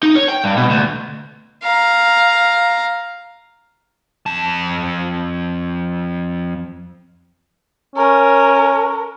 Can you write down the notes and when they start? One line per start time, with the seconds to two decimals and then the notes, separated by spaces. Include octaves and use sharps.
0.03 D#4
0.16 C#5
0.29 G5
0.44 G2
0.58 B2
0.71 D2
1.63 F5 A#5
4.26 F2 A5
7.96 C#4 A#4